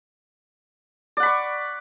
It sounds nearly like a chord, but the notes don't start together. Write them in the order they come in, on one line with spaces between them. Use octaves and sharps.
D5 F#5 B5 C#6